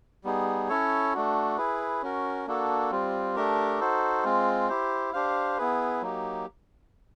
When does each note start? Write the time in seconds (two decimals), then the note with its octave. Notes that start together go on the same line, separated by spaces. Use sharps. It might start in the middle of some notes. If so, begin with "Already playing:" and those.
0.24 G3 B3 D#4 G#4
0.69 C#4 E4 A4 C#5
1.14 A3 D4 F#4
1.58 E4 G#4 B4
2.02 C#4 F#4 A#4
2.47 A#3 D4 F#4 A4
2.91 G3 C4 F4
3.36 A3 D4 G4 A#4
3.80 D#4 F#4 A4 C5
4.25 G#3 C4 F4
4.69 E4 G4 C5
5.13 D4 G4 C5 F5
5.58 B3 E4 G#4 B4
6.02 F#3 A#3 D#4 G4